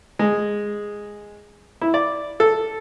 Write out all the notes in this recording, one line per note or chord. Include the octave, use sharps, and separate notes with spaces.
G#3
E4
D5
A4